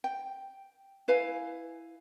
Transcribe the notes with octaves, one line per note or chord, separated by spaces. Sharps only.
G5
E4 B4 F5 G#5